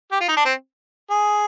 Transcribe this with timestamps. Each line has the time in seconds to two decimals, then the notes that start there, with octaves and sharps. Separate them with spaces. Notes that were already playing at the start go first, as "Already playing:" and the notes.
0.12 G4
0.21 F4
0.28 D#4
0.37 D4
0.45 C4
1.11 G#4